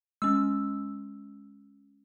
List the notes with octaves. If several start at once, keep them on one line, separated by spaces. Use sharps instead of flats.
G#3 C#4 E6